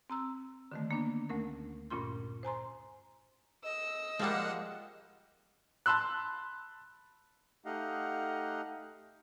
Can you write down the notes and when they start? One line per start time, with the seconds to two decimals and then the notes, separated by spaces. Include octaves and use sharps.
0.10 C4 A#5 E6
0.72 D3 D#3 A3
0.91 A#3 B3 D4
1.29 D2 A3 C#4 A#4
1.90 G2 A#2 C#4 F4 C6
2.43 C5 G#5 A#5 C6
3.64 D#5 E6
4.19 F3 G3 G#3 A#3 F#5
5.86 A5 B5 C6 E6 F#6
7.65 A3 D#4 G4 D#5 F5 F#5